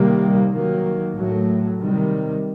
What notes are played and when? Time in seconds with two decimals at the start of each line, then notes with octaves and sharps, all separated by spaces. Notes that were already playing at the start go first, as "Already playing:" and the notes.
Already playing: C3 D#3 G3 A#3
0.50 D#3 F#3 A#3
1.15 A2 F#3 A3
1.80 C3 D#3 G3